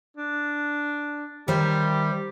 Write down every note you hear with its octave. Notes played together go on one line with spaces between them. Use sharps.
D4
D#3 G3 C5 E5